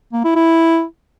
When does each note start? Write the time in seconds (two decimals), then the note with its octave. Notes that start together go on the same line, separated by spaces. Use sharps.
0.13 A#3
0.24 E4
0.35 E4